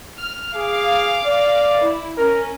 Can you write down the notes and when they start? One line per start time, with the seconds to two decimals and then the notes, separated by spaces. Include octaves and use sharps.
0.18 F6
0.54 G#4 F5 D6
1.24 D5
1.79 E4
2.17 C#4 A#4